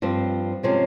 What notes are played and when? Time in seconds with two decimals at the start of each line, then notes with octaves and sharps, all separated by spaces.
0.02 G2 F3 C4
0.63 C3 F3 G#3 C#4